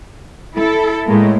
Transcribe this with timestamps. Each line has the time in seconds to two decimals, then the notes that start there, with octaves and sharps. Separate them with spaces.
0.55 E4 A4
1.06 A2 G#3 A#3